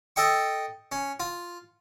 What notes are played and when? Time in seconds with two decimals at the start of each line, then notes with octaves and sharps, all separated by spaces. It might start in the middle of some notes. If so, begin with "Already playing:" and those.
0.16 A4 D#5 G5 C#6
0.92 C#4
1.20 F4